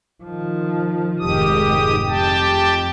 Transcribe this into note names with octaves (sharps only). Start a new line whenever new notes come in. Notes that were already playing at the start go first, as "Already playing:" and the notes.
D#3 F3
F1 G#2 D#3 G4 D#6
F2 G4 G5 A5